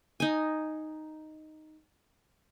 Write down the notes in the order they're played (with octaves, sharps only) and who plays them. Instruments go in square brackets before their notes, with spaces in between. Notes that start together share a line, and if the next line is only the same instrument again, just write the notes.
[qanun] D#4 G#5